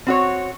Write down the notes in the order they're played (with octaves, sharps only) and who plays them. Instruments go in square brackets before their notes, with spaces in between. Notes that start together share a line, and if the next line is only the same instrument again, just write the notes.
[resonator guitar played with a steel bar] C4 F#4 C#5